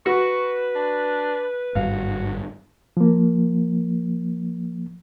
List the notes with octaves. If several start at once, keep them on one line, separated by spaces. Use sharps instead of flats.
F#4 B4 C#6
D4
G#1 G2 F#4 F5
F3 A#3